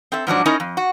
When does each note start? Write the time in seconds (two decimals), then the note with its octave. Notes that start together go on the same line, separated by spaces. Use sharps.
0.12 C4 A4 E5
0.27 G#2 F3 F#3 D4
0.46 C#4 D#4 E4 A#4 D#5
0.60 F2
0.77 F#4